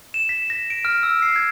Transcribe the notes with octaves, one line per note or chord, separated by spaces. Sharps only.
E7
B6
A#6
D7
F6
E6
C7
G#6